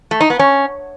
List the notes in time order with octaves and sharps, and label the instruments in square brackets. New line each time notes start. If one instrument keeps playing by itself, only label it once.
[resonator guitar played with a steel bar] A3
D#4
B3
C#4